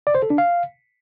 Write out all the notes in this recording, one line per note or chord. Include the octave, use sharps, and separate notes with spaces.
D5
C5
A4
D4
F5